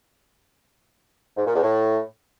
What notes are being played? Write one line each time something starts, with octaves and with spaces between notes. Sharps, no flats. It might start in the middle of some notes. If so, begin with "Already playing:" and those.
G#2
A#2
E2
A2